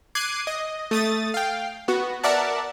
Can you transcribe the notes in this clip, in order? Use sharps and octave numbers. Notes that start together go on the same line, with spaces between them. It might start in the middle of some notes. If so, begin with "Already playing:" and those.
D6 F#6 G#6 C7 D#7
D#5
A3 D#6 A6
F5 G5
B3 F#4
A#4 D5 E5 F#5 A5